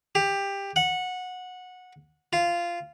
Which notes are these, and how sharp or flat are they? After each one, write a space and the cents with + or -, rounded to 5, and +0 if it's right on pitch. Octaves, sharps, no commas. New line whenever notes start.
G4 +15
F#5 -15
F4 -15